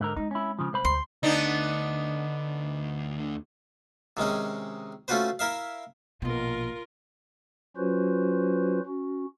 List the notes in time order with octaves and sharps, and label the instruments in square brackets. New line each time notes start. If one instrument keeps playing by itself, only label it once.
[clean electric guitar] G#2 D3 A#4
[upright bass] G#3 C4 [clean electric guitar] D#4
[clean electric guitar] C#4 E4
C#3 F3
C2 C5 B5
[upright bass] D2 [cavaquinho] C6
[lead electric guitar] D2 D3 [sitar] B3 D4 D#4
[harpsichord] C3 D#3 G#3 C#4
A3 C#4 F4 F#4 B4 C5
E4 A#4 E5 F5
[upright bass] A#1 B2 [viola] F4 A#4
[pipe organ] F#3 C#4 F4 F#4 B4 C5
C#4 F#4